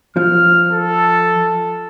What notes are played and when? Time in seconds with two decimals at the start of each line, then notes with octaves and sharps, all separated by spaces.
0.16 F3 F6
0.72 A4